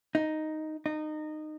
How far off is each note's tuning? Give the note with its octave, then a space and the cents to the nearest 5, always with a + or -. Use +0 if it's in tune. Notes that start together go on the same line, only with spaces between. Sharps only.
D#4 +0
D#4 -20